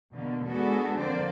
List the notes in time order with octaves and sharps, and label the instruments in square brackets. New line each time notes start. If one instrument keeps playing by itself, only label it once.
[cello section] B2 D3 A#3
G#3 B3 D4 F#4 G#4 A4
D3 F3 A#3 C4 C5 D5